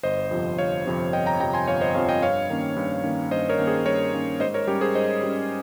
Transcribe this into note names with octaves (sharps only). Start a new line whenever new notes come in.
G1 C5 D#5
F2 C3 F3
G1 C#5 F5
F2 C3 F3
G1 D#5 G5
G5 A#5
F2 C3 F3 G5 A#5
G#5 C6
G1 C#5 F5
C5 D#5
F2 C3 F3 C#5 F5
D#5 G5
G2 C#5 F5
D#3 A#3 C#4
G2
D#3 A#3 C#4
G2 C5 D#5
A#4 C#5
D#3 A#3 C#4
G#4 C5
G2 A#4 C#5
D#3 A#3 C#4
G#2 C5 D#5
A#4 C#5
G3 C#4 G4 A#4
G#4 C5
G#2 C5 D#5
G3 C#4